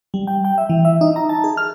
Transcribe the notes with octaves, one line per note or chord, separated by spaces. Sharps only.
G3
G5
G5
E5
E3
E5
D#4
A#5
A5
G#4
F6